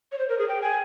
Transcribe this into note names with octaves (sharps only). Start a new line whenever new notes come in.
C#5
C5
A#4
G#4
G5
G#5